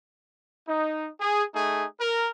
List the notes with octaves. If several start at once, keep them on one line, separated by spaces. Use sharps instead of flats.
D#4
G#4
A3 D#4 G#4
A#4